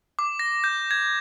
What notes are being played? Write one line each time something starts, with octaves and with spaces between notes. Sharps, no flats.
D6
A#6
G6
G#6